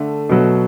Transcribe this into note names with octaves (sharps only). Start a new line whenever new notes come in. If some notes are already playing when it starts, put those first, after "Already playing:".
Already playing: D3 A3
B2 F#3 A3